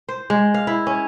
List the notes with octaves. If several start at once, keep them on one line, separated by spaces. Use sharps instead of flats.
C5
G#3
F5
E4
C#4